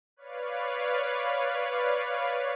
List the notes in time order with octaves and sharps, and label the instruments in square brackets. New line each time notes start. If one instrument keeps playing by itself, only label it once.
[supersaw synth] B4 C#5 D5 F5